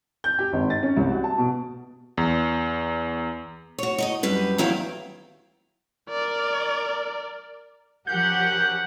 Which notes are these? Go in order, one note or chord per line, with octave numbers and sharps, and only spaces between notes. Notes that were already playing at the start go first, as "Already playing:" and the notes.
G6
G4
G#1
A6
C#4
C2
F#4
A5
B2
E2
F#4 C#5
D#4 D5 D#5
F#2 G3 B4
E2 D#3 F#3 E4 F5 G5
A#4 D5
F3 C#4 G4 A#4 F#5 G6